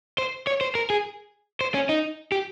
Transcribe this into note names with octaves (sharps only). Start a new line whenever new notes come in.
C5
C#5
C5
A#4
G#4
C5
C#4
D#4
G4